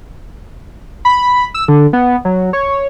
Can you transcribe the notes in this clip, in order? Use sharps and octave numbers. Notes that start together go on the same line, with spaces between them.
B5
E6
D3
B3
F#3
C#5